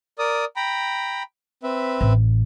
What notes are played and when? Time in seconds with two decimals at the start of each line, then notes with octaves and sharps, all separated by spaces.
0.19 A#4 D5 D#6
0.56 G5 A#5 B5
1.63 C4 B4 E5
2.01 A1